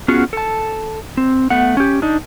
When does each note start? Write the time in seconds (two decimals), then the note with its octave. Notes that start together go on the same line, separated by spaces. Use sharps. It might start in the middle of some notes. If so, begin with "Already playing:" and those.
0.08 B3 C#4 F4 F#4 G#4
0.33 A4 A5
1.17 C4
1.50 A3 B3 F#5
1.77 C#4 G4
2.02 D4 D#4